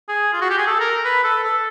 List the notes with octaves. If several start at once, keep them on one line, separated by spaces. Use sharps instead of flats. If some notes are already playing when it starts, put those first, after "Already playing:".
G#4
F4
F#4
G4
G#4
A4
A#4
B4
A4
A4